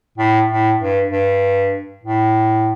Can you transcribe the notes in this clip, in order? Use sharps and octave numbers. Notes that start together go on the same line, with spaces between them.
A2
A2
G2
G2
A2